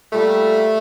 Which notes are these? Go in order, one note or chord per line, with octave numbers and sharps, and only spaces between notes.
A#2 G3 A3